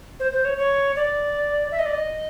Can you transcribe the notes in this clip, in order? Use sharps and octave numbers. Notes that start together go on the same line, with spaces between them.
C5
C5
C#5
C#5
D5
E5
D#5
D5
D#5